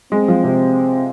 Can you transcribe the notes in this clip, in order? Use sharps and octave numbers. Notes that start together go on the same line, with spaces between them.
G#3 C4
F3
C3